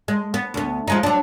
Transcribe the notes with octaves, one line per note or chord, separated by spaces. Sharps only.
G#3
B3
D2 B3
F3 G#3 D#4
F#3 D4